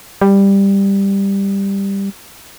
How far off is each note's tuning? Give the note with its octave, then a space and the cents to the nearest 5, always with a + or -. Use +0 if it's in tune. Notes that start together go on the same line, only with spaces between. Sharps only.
G3 +10